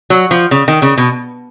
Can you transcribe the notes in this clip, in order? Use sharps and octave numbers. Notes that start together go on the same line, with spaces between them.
F#3
F3
C#3
D#3
C#3
B2